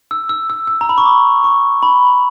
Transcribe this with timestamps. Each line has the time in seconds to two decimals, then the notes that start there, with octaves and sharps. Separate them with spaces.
0.11 E6
0.29 E6
0.50 E6
0.67 E6
0.81 A#5
0.89 B5
0.98 C#6
1.06 D6
1.44 C#6
1.83 B5